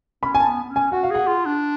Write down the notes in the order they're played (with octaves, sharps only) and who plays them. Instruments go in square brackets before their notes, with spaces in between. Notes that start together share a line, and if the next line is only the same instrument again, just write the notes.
[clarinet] C#4 [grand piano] B5
[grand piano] G#5
A5
[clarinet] B3
B3
C#4
[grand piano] G#5
[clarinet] F#4 [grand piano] F#5
[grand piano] F5
[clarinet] G#4 [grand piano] F#5
[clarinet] F4
D4